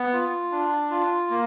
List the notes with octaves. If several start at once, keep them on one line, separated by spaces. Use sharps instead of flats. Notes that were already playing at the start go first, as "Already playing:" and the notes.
Already playing: B3
F4
D4
F4
A#3